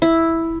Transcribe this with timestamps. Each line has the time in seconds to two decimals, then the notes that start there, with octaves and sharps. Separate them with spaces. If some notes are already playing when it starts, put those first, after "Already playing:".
0.02 E4